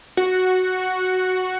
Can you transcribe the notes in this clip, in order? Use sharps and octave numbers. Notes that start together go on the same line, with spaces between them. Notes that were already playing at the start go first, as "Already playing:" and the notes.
F#4